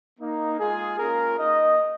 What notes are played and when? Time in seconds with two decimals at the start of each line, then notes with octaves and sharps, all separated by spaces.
0.20 A#3 D#4
0.60 G#3 F4 G#4
0.99 A#3 C#4 F4 A#4
1.38 A#3 D#4 D#5